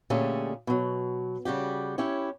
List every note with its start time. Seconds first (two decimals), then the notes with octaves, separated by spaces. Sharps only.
0.10 A#2 D3 A3 C#4 G4 G#4
0.67 B2 F#3
1.45 C#3 G3 F#4 G4
1.98 C#4 E4 G4 C#5